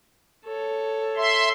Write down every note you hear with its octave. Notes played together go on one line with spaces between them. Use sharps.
A4 C#5
E5 C6